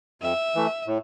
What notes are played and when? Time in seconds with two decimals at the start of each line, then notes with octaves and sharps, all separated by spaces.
0.22 F2 E5
0.55 E3 A3
0.87 A2